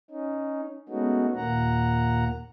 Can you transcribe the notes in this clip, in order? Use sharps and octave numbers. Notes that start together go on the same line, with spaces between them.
C#4 D#4
G#3 A3 B3 C#4 D#4 F#4
D#2 A#2 A#3 F#5 A#5